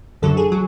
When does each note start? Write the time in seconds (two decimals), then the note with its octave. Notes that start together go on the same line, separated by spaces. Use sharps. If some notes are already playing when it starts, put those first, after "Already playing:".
0.22 F#2 D3 F#3 A4
0.37 G#4
0.52 F#3